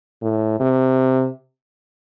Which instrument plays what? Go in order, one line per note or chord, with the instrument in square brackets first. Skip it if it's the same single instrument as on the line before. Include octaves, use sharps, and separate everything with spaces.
[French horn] A2
C3